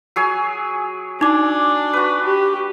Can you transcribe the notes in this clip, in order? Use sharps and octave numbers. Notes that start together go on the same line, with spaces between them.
F#3 G#4 G#5
D4 D#4 D6
F#4 B4
G4